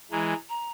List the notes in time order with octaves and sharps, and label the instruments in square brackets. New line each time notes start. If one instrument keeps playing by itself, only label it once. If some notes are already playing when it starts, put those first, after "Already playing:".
[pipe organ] E3 G#3 [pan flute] A#5
[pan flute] A#5